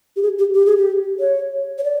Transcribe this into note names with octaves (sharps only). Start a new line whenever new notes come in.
G4
G#4
G4
G4
G#4
G4
C#5
C#5
D5